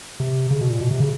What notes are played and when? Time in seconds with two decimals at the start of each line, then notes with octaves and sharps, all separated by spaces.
0.20 C3
0.51 C#3
0.61 B2
0.70 A#2
0.81 B2
0.91 C3
1.00 C#3